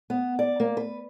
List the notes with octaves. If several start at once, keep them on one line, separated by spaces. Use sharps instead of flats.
B3
D5
A#3
B4